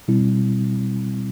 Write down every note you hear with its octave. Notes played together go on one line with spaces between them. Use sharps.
B2 G3 C4 E4